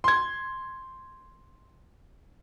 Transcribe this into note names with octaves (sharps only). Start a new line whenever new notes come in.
C6 G#6